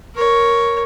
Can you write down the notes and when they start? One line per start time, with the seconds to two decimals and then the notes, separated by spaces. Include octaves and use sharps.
0.14 A#4 C#5